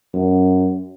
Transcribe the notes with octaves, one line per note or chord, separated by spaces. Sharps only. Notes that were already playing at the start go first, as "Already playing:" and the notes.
F#2